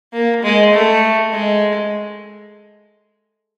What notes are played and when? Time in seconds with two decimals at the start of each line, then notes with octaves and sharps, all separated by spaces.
0.13 A#3
0.43 G#3
0.74 A3
1.33 G#3